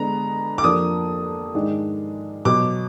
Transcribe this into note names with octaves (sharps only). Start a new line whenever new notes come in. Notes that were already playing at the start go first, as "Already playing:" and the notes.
Already playing: D3 G#3 B3 D4 A#5
D6
F2 F3 A#3 D4 D#6
G#2 D#3 G#3 D4
B2 F#3 B3 D6